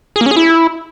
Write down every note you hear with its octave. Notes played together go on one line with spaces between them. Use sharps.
G#4
A#3
C#4
G#4
E4